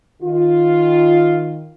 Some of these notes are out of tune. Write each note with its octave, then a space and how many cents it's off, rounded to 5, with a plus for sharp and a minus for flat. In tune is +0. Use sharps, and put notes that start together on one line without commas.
D#3 +0 F4 +0